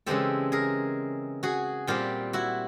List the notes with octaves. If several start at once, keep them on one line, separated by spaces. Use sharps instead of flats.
C#3 E3 G#3 C4 G4 A4
G#4 A#4
F#4 G#4
A#2 G3 C4 F4 G4
E4 F#4